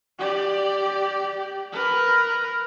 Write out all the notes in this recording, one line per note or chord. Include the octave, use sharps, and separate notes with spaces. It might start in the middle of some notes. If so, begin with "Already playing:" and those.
G4 D5
A#4 B4